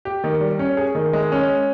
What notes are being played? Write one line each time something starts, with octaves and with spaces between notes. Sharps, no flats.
G4
D#3
G3
C#4
G#4
D#3
G#3
C#4